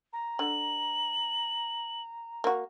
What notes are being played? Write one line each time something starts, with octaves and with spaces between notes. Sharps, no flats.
A#5
D3 F#7
A#3 F#4